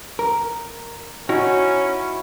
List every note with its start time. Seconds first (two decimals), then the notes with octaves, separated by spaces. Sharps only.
0.19 A#4
1.29 C#4 D#4 E4 F#4